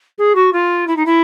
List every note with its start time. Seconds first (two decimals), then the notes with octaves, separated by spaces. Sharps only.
0.18 G#4
0.35 F#4
0.53 F4
0.87 E4
0.96 D#4
1.05 E4